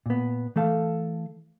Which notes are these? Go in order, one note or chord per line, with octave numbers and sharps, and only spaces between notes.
A#2 B3
E3 A3 A4 F5